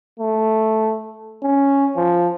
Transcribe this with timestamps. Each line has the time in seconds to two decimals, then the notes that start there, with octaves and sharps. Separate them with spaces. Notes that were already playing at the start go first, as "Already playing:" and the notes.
0.19 A3
1.43 C#4
1.96 F3